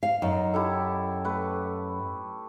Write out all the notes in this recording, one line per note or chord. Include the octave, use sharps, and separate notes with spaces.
F5
F#2 D#4
E4 G4 A4
A3 B4